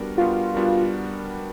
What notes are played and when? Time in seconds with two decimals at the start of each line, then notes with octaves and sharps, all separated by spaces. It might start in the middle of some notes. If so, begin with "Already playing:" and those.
Already playing: G3 B3 D4 F#4 A#4
0.18 G3 B3 D4 F4 F#4 A#4
0.55 G3 B3 D4 F#4 A#4